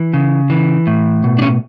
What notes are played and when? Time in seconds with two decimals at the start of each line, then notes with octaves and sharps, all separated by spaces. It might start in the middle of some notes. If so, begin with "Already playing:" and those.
Already playing: E3
0.14 C#3
0.50 E3
0.87 A2
1.24 B2
1.38 D4
1.42 C#4